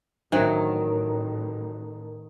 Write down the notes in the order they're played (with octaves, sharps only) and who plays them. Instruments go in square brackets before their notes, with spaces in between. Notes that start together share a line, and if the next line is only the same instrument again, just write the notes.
[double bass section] A1 [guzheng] D#3 [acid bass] F#3 [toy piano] D4 C5 E5